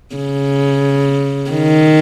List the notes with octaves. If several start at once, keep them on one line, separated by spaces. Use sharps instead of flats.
C#3
D#3